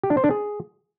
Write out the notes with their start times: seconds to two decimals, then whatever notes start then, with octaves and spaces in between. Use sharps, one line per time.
0.04 G4
0.10 D4
0.17 C5
0.24 D4
0.31 G#4